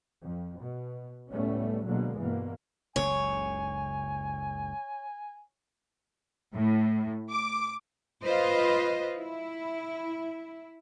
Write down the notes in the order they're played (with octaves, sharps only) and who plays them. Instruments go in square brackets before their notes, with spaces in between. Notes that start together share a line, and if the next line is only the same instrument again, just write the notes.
[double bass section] F2
B2
C#2 A2 G3 A3 B3 C#4
B2 D3 F#3 G#3 A#3
G2 B2 E3 A#3
[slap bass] F#1 C#2 C#3 [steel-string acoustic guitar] C#5 [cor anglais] G#5
[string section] A2
D6
[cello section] F4 B4 C5 D#5
E4